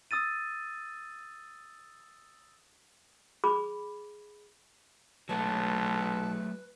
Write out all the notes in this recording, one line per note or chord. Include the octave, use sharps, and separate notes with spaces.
D#6 E6 A6 D#7
G#4 B5 D6
B1 F#3 G#3 A3 B4 A5